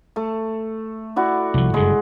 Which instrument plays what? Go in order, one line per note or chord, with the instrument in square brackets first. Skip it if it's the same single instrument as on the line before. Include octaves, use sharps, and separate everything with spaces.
[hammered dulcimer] A3
E4 F#4 D5
[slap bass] C2 F3
[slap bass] F#1 G2 [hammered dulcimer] G#3